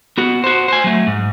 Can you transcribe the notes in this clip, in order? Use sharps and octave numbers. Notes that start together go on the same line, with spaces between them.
B3 F#4
F#4 C5
C5 G#5
F#3 A3
G#2